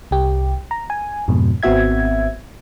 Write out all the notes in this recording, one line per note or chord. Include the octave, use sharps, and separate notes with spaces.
C2 G4
A#5
G#5
F2 G#2 B2
G#1 B3 C4 F#4 E5 G#6